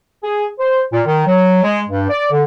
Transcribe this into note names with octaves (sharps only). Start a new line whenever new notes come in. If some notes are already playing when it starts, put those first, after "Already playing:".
G#4
C5
A#2
D#3
F#3
G#3
G2
D5
D3